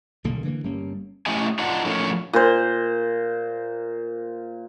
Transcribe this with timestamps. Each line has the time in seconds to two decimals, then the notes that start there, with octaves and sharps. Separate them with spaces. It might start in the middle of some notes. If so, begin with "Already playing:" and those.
0.24 D#1 B1 D3 A#3
0.43 D3 E3 A#3
0.63 G1 G3 A#3 C#4
1.26 A3 C#4 E4 G4 D#5 G#5
1.59 D4 D#4 F4 D#5 F#5
1.86 F3 A3 C#4 A4 A#4 C#5
2.33 A#2 C5